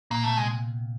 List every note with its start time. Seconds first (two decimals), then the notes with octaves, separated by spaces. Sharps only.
0.11 A#2 A#3
0.24 B2 A3
0.37 C3 G#3